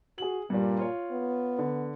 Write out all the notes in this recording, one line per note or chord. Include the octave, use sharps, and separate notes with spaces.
F#4 G#4 F#7
G2 A#2 G3
F4 C#5
B3
D3